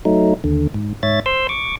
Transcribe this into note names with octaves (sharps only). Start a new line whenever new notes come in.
F#3 A3 D#4
D#2 D3
G#2
G#2 C#5 E5 A6
C5 C6 E6
C#6 D6